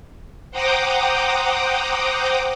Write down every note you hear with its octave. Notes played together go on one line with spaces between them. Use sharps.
C5 F#5 G5 A#5 D6 D#6